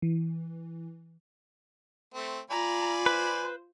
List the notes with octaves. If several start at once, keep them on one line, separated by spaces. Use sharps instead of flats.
E3
A3 C4
F4 D5 G#5 A#5 B5
B4 C5